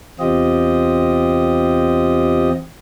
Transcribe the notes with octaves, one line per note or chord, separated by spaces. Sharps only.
E2 C3 C4 F4 G4 D#5